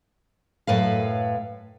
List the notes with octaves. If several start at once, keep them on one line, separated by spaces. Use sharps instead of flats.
F#2 A2 B4 F5